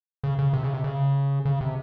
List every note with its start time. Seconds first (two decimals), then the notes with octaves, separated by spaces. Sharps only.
0.24 C#3
0.39 C#3
0.54 C3
0.63 C#3
0.73 C3
0.84 C#3
1.45 C#3
1.61 C3